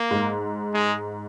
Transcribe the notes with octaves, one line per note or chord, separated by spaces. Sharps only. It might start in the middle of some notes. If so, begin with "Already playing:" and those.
Already playing: A#3
G#2
G#3